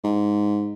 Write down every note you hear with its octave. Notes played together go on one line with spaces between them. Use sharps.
G#2